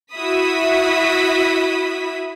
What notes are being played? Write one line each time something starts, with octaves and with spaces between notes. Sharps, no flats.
E4 F#4 E5 B5 D#6 B6